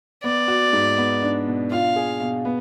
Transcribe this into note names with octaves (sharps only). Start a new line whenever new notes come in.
B3 D5
F#4
G#2
B3
D4
B2
F4 F5
G#4
B2
B3